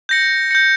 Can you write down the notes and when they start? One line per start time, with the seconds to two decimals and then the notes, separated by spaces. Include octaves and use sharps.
0.09 G6 A#6 C#7
0.51 G6 A#6 C#7